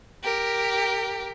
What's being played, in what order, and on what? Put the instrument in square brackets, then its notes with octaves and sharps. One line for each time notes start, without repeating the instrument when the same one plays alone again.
[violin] G4 A#4